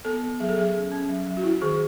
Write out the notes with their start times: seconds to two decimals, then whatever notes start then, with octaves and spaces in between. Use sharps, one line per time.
0.05 B3 A4
0.23 B3
0.40 F#3 G#4
0.49 A4
0.58 F#3 G#4
0.75 C#4
0.91 C#4
1.09 F#3
1.27 F#3
1.37 F#4
1.44 F#3 E4
1.62 D#3 G#4